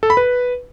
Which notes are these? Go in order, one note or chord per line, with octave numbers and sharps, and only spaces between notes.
A4
B5
B4